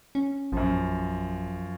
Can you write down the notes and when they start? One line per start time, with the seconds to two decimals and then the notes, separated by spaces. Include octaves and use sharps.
0.15 C#4
0.52 A#1 F#2 F3